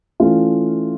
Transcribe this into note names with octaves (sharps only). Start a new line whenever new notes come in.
E3 A3 C#4 F4